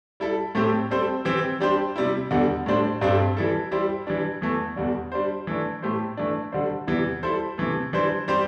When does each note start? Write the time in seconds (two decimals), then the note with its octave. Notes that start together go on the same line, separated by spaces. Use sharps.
0.20 G3 E4 A4
0.55 A2 A3 C4 G4
0.91 G3 C4 A4 C5
1.25 E3 C4 E4 G4
1.60 G3 D4 G4 C5
1.96 C3 G3 E4
2.31 E2 D3 G3
2.66 A2 G3 D4 C5
3.01 G2 G3 C4 A4
3.37 E3 G3 E4 A4
3.71 G3 E4 G4 C5
4.07 E3 G3 D4
4.41 E2 E3 A3
4.76 E2 D3 G3 D4
5.12 G3 D4 C5
5.47 E3 A3 D4
5.82 A2 A3 E4 G4 C5
6.17 E3 A3 D4
6.52 D3 G3 D4 C5
6.87 E2 C3 E3 G3 E4
7.23 G3 E4 A4 C5
7.58 C3 E3 A3
7.93 E3 G3 D4 C5
8.28 G3 C4 G4 C5